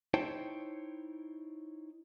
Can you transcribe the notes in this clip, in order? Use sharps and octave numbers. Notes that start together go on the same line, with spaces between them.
D#4 E4 C5 C#5 G5 A5